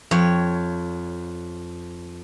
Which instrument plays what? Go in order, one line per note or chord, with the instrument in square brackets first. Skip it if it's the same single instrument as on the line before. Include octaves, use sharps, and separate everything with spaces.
[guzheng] F2 C#5